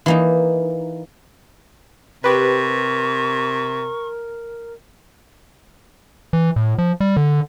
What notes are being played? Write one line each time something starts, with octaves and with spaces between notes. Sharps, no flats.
E3 A#3 D#4
C3 G4 A#4 B4 C#6
E3
A2
F3
G3
D3